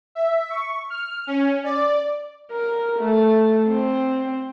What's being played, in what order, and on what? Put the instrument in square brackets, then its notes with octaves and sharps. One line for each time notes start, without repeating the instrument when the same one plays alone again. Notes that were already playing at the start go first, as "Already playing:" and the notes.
[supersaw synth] E5
C#6
F6
C#4
D5
[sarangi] A#4
A3
C4